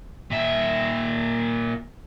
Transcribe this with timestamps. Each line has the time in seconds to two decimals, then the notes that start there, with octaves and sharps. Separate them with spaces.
0.31 A#2 E5